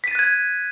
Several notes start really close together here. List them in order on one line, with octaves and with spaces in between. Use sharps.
B6 D#7 A6 F#6 G#6